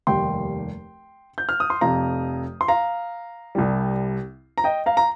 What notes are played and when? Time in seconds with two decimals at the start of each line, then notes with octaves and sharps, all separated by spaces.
0.07 F1 D#2 D#3 G3 G5 C6
1.38 G6
1.49 F6
1.60 D#6
1.70 C6
1.81 F1 F2 C3 F5 A#5
2.61 C6
2.68 F5 A#5
3.55 C2 C3 G3
4.58 A#5
4.64 D#5 G5
4.86 F5 A#5
4.97 A#5